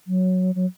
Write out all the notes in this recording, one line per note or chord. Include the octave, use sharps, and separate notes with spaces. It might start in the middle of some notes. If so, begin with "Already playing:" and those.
F#3
F#3